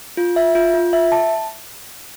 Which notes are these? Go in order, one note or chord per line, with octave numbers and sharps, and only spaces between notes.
F4
E5
F4
F4
E5
A5